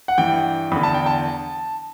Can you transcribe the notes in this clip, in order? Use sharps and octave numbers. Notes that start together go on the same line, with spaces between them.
F#5
G2 E3 G5
E2 D3 B5
A5
G5
A5